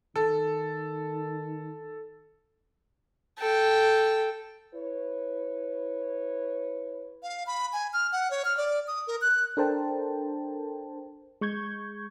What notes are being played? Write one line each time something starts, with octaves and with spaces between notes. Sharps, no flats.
D#3 A4
A4 G5
E4 B4 C#5
F5
B5
G#5
F6
F#5
C#5
F6
D5
D#6
A#4
F#6
D4 A4 A#4 C5 G5 A5
G#3 C#6 G6 G#6